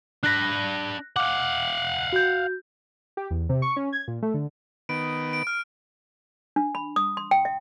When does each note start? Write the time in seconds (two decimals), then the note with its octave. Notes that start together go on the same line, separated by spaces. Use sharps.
0.23 D4 B5 F#6 A#6
1.16 F5 F#5 D6
2.13 F#4 G6
3.17 G4
3.31 E2
3.49 C3
3.62 C#6
3.76 C#4
3.93 G#6
4.08 A#2
4.22 A3
4.34 D3
4.89 D#3 B3 D7
5.33 D7
5.47 F6
6.56 D4
6.75 B5
6.96 D#6
7.17 C6
7.31 G5
7.45 E5